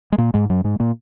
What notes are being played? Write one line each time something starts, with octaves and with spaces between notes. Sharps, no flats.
G#3
A#2 A#3
G#2 G#3
F#2 F#3
G#2 G#3
A#2 A#3